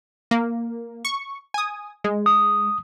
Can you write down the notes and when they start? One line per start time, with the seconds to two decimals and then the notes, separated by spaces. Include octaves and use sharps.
0.31 A#3
1.05 C#6
1.54 G#5 D#6
2.04 G#3
2.26 D#6